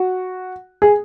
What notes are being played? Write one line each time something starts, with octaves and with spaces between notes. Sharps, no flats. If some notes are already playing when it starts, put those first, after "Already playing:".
Already playing: F#4
G#4